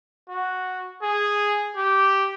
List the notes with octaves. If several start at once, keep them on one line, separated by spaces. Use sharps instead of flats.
F#4
G#4
G4